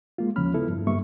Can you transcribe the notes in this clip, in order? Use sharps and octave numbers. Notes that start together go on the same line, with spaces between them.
G#3 A#3 F4
D#2 C#3 F3 C#4 B5 F6
B3 E4 A4
G2
G2 A#3 E5 C#6